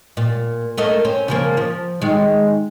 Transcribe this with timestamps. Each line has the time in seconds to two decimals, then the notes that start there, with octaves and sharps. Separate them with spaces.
0.17 A#2
0.78 A3 A#3 D#5
1.05 C4 C#4
1.28 C#3 F3 A#3
1.57 F3
2.02 D#3 G#3